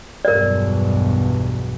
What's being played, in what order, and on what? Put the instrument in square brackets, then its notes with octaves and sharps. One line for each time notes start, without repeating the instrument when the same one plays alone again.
[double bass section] B1 E2 G2 [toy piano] A#4 D5